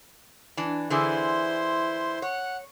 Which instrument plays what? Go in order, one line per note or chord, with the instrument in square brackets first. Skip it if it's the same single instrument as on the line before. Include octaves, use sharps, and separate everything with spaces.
[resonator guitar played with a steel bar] E3 D4
[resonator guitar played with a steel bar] D3 E3 G#4 [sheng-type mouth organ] E4 C5 C6
[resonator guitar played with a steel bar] C#5 [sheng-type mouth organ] F#5